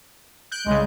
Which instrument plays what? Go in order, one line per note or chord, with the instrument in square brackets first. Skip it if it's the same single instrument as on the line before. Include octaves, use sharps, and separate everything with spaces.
[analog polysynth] F#6 G6 D7
[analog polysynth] C2 C#3 [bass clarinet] G#3